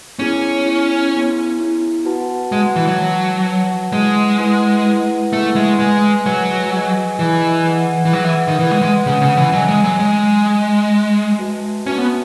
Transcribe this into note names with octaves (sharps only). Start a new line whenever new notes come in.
B3 C#4 E4 G#4
B3 E4 G#4
B3 E4 G#4
B3 E4 G#4
F#4 B4 F#5 A5
G#3 F#4 B4 F#5 A5
E3
F#3
F#4 B4 F#5 A5
F#4 B4 F#5 A5
G#3 E4 G#4 B4 F#5
E4 G#4 B4 F#5
E4 G#4 B4 F#5
A3 E4 G#4 B4 F#5
G#3
G#3 G#4 B4 D#5 G#5
F#3 G#4 B4 D#5 G#5
G#4 B4 D#5 G#5
E3 G#4 B4 D#5 G#5
G#4 B4 F#5
E3
F#3 G#4 B4 F#5
E3
D#3
E3 G#4 B4 F#5
G#3
G#3
C#3 G#4 B4 F#5
C#3
E3
F#3 G#4 D#5 G#5
G#3
F#3
G#3 G#4 D#5 G#5
G#4 D#5 G#5
G#4 D#5 G#5
F#4 B4 E5 A5
C#4 F#4 B4 E5 A5
B3